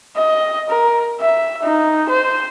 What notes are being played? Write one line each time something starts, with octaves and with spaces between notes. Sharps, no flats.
D#5
A#4
E5
D#4
C5